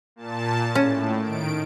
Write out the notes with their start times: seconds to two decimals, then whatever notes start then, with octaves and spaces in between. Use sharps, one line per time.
0.16 A#2 A5
0.75 A2 C#4
1.22 D#3 D7